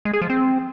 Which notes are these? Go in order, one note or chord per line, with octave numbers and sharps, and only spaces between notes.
G#3
G#4
F3
C4